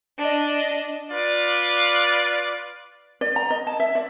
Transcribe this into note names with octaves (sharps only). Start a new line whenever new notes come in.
D4 D#5
F4 B4 D5
D5
A#5
D#5
A5
E5
D5